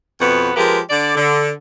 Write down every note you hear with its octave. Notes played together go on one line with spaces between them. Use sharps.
F2 B2 B3 F#4
F3 G#3 G4 A#4 B4
D3 D4 D5
D3